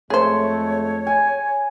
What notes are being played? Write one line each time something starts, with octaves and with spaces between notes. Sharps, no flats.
F2 G#3 A3 G#4 C5 C#5
G#5